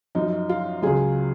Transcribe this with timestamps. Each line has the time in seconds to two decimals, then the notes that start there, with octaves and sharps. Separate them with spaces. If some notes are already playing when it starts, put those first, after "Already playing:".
0.15 F#2 D#4
0.20 F3
0.49 F4
0.82 C#2 C#3 F#3 F4 G#4